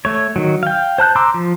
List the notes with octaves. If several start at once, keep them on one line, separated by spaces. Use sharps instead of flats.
A3 C#5
D#3 F#3
F5 G5
C5 A5 F#6 G6
A#5 C6 D6 E6
F3